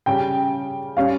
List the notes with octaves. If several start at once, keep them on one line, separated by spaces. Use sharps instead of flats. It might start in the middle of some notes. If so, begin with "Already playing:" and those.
C#3 G3 C#4 G5
G3 C#4 F5